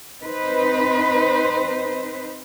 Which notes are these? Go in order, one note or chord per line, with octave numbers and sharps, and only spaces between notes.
C4 D#4 B4 C5